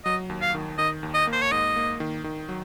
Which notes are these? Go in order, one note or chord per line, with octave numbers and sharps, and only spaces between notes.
F#3 D#5
D#2
F5
D#3
D#3 D#5
D#2
D#5
A#3
C5
C#5
G#2 D#5
A#3
D#3
D#3
F#3